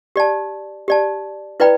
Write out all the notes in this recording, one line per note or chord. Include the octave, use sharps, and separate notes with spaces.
G4 D5 A5
G4 D5 A5
E4 B4 D5 G5 B5